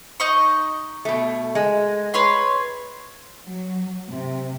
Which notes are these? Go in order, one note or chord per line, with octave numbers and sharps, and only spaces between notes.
D#4 D#5 C#6
B2 A3
G#3
B4 C#5 C6
F#3
C3